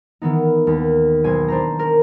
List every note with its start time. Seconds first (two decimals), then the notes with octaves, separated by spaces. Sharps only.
0.22 D#3 E3 B3 D#4
0.67 D#2
1.24 B1 C5 G#5
1.48 D4 C5 A#5
1.79 A#4